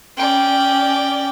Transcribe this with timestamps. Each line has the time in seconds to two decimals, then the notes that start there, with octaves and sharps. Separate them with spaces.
0.17 C#4 D5 G5